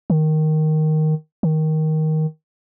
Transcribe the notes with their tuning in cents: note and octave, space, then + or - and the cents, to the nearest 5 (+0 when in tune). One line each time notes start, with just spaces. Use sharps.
D#3 +0
D#3 +10